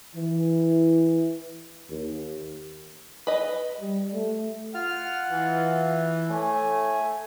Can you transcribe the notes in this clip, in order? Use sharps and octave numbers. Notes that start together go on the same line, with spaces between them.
E3
D#2
B4 D#5
G3
A3
F4 F#5 F6
E3
A2 A3 G#5